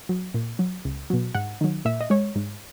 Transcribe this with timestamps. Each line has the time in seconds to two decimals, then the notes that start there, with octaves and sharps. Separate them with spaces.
0.09 F#3
0.34 A#2
0.59 F#3
0.85 C#2
1.10 B2 F#3
1.35 G#2 F#5
1.61 D#3 F#3
1.85 A#2 E5
2.01 D#5
2.10 G#3 C#5
2.35 G#2